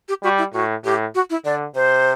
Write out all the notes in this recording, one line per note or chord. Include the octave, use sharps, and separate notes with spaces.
G4
G3 F#4
E4
A2 F#4
A2 G4
F#4
E4
D3 D5
C3 C5